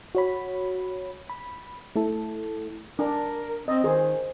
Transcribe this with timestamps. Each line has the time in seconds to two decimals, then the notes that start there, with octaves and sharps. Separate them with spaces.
0.15 F#4 C#5 B5
1.30 B5
1.96 A3 E4 A4
2.99 D4 A#4
3.68 C4 D#5
3.84 D#3 G#4 C5